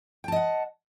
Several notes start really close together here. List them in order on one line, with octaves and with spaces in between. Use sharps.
G5 A5 D#5 F#5